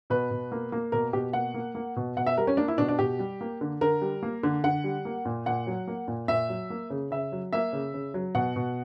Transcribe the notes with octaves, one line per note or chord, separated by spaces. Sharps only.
B2 B4
B2
A#3
A#3
B2 A#4
B2 G4
A#3 F#5
A#3
A#3
B2
B2 F#5
E5
G3 A#4
C#4
A#3 D4
E4
B2 D4
D4
B2 G4
G3
A#3
D3
D3 A#4
G3
A#3
D3
D3 F#5
G3
A#3
A#2
A#2 F#5
F#3
A#3
A#2
A#2 E5
F#3
A#3
C#3
C#3 E5
F#3
A#3 E5
C#3
C#3
F#3
B2 F#5
B2